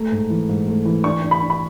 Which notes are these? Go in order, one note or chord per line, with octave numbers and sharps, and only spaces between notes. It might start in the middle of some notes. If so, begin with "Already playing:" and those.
Already playing: A3 A#5
G#2
E3
G#2
A3
E3
D4 C#6
D4
B5
D4
B5